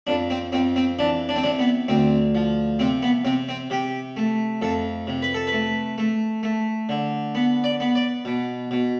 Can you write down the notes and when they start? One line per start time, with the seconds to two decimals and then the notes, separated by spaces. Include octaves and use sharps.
0.07 F2 D4
0.30 C4
0.52 F2 C4
0.76 C4
0.99 E3 D4
1.29 D4
1.36 C4
1.43 C3 D4
1.59 B3
1.88 D2 C4
2.35 F3
2.79 C3 C4
3.02 B3
3.25 C3 C4
3.49 C4
3.70 C3 G4
4.17 A3
4.62 F2 A4
5.07 C3
5.22 B4
5.34 A4
5.47 B4
5.52 A3
5.98 A3
6.43 A3
6.89 D3
7.35 B3
7.64 D5
7.80 B3
7.95 D5
8.25 B2
8.71 B2